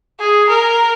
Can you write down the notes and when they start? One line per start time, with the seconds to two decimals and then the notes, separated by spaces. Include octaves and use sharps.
0.20 G#4
0.49 A#4